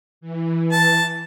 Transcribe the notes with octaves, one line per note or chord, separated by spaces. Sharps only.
E3
A5